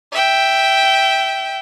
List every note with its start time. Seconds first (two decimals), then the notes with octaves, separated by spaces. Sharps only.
0.13 E5 G5